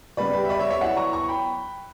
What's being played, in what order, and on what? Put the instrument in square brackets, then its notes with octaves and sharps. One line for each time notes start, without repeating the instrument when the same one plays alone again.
[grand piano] C#3 G3 B3 B4 D5
G4 B4
E5
B4 D5
C#5 E5
C#5 E5
F#3 B3 E4 D5 F#5
A#5 C#6
A#5 C#6
C#6
G5 B5